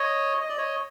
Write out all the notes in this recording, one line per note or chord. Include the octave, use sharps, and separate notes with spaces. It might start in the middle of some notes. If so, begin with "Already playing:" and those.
Already playing: C#5 D#5
D#5
D5
C#5 D#5